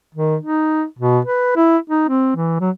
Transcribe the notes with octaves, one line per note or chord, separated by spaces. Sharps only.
D#3
D#4
B2
B4
E4
D#4
C4
E3
F#3